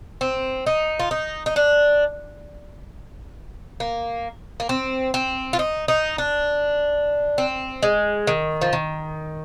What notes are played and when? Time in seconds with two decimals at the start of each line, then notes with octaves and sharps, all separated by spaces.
0.21 C4
0.66 D#4
0.99 F4
1.11 D#4
1.46 D#4
1.56 D4
3.80 A#3
4.60 A#3
4.69 C4
5.14 C4
5.53 F4
5.59 D#4
5.88 D#4
6.18 D4
7.38 C4
7.82 G#3
8.27 D#3
8.61 F3
8.73 D#3